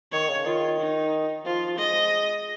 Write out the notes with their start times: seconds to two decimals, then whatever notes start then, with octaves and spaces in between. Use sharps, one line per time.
0.12 D#3 C#5
0.29 C#3
0.46 D#3 F4
0.79 D#4
1.45 F3 F4
1.78 G#3 D#5